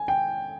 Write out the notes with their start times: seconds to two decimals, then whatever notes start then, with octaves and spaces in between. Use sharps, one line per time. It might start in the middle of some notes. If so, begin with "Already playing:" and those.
Already playing: G#5
0.08 G5